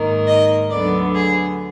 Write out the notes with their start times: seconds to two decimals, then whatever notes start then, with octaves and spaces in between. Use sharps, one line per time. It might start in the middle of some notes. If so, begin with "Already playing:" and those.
Already playing: G#2 D#3 A#3
0.27 D#5
0.70 D2 D3 F#3 B3 D5
1.14 G#4